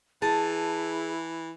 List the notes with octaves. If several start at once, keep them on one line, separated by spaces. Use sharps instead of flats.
E3 E4 G#4 A5